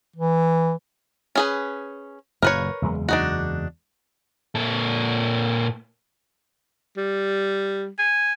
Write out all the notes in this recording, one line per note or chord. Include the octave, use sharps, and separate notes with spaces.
E3
C#4 G#4 B4
F#1 F#2 A#2 A#4 B4 C#5
F#1 E2 G#3
D4 D#4 F#4
A#2 A4
G3
G#5